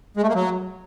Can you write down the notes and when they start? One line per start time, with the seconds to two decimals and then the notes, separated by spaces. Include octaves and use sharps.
0.17 G#3
0.23 A3
0.29 A#3
0.35 F#3